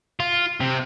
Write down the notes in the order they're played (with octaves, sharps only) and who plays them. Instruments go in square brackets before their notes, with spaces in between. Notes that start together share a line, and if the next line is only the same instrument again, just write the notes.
[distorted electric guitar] F4
C3